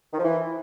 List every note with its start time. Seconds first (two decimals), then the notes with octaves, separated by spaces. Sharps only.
0.13 D#3
0.18 F3
0.24 E3